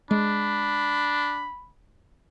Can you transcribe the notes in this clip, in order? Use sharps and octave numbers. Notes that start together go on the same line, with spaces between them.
G#3 D4 B5